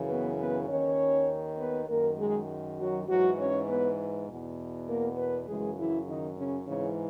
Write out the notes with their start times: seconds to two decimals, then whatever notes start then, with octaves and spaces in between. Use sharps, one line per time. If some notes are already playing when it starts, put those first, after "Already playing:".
Already playing: F#2 C#3 E3
0.08 B3 B4
0.38 B3 B4
0.68 D#2 D#3 C#4 C#5
1.58 B3 B4
1.88 F#2 D#3 A#3 A#4
2.18 G#3 G#4
2.78 F#3 F#4
3.08 G#2 E3 F#3 F#4
3.38 C#4 C#5
3.67 B3 B4
4.28 E2 B2
4.88 A#3 A#4
5.17 B3 B4
5.47 F#2 C#3 E3 G#3 G#4
5.77 E3 E4
6.07 D#3 D#4
6.37 C#3 C#4
6.67 G#2 C#3 E3 C#4